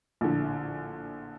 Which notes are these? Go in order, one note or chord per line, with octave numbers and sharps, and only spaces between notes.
A#1 A2 D3